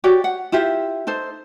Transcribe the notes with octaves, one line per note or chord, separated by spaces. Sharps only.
F#4 G4 C#5 D5
F#5
E4 F4 G4 E5
D#4 A4 C5